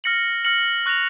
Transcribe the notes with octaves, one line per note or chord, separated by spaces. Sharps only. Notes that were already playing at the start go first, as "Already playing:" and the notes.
F6 A#6 C#7 F#7
F6 A#6 C#7 F#7
C#6 F#6 A#6 F7